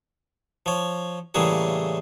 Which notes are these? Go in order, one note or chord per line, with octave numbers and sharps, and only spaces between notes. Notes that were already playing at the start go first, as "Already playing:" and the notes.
F3 C#5
A2 C#3 E3 G3 A#3 G#4